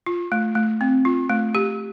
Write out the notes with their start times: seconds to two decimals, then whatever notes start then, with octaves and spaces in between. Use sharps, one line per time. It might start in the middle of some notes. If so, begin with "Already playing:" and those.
0.06 F4
0.32 A3
0.55 A3
0.81 C4
1.05 F4
1.30 A3
1.55 G4